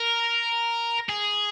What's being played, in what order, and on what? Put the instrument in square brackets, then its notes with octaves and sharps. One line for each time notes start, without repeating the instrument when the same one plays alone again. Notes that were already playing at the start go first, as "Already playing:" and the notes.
Already playing: [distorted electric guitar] A#4
G#4